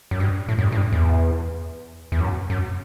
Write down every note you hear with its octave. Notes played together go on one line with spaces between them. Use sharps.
F#2
G2
A2
F#2
G2
A2
G2
E2
E2
F#2
F#2